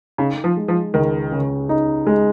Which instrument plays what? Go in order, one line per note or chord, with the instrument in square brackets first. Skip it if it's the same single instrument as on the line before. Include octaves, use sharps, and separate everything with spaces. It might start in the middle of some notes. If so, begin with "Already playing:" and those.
[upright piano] C#3 [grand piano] D#4
[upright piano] F3
[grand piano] G#3
[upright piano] F3
[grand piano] C#2 [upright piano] D#3
[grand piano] C#3
D#4
G#3